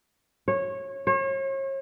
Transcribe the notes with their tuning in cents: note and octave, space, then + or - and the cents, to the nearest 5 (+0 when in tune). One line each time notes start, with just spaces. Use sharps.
C#5 -20
C#5 -40